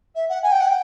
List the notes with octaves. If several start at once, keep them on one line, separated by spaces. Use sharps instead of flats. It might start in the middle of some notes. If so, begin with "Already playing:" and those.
E5
F#5
G#5
G5
F#5
G5